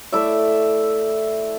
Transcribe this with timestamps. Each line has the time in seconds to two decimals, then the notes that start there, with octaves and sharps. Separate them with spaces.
0.12 A3 E4 D5 E5